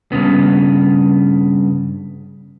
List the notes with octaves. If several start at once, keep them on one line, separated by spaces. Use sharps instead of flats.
G2 A#2 C#3 B3